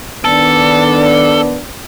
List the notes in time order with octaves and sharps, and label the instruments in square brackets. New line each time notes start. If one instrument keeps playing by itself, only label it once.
[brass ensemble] D#3 D4 [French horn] B3 [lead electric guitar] A4